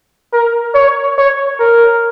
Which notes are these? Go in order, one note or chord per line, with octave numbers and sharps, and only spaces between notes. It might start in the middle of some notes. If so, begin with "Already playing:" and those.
A#4
C#5
C#5
A#4